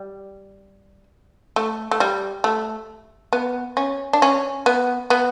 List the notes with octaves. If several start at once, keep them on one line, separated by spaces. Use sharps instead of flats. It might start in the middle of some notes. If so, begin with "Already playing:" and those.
Already playing: G3
A3
A3
G3
A3
B3
C#4
D4
C#4
B3
B3